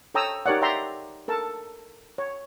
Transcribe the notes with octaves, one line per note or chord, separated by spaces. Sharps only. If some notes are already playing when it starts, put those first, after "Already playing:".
A4 C#5 G5 A#5 D#6 E6
D#4 G4 A#4 C#5 D5 F#5
D5 E5 F#5 G5 A#5 C6
A4 A#4 A5
C#5